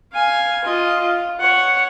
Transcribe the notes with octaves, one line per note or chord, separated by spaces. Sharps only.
F5 G#5
F4 D#5
F4
C#5 F#5